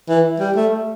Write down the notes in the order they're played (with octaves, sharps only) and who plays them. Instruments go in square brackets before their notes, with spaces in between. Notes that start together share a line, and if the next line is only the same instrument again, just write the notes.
[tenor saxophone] E3
G3
A3